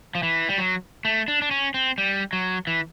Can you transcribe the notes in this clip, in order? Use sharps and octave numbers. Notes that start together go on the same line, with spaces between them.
F3
E3
G3
F#3
A3
D4
D4
C#4
C4
G3
F#3
E3